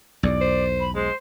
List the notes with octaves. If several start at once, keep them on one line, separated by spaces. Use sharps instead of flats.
B1 E2 D5
C5
B5
G#3 C5